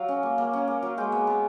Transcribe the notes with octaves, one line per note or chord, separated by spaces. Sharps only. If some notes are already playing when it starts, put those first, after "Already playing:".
Already playing: F#3 F5
C#4
A#3
A#3
C#4
A#3
F#3
G#3 G5
B3
B3